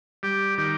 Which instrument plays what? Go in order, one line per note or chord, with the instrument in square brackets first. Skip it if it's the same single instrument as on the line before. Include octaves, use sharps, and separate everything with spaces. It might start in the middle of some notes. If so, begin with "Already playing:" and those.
[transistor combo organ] G3 G4
D#3 G4